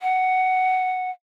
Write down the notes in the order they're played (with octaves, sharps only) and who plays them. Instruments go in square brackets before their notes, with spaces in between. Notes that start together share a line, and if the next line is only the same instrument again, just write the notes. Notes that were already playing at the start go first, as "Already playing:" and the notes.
[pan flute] F#5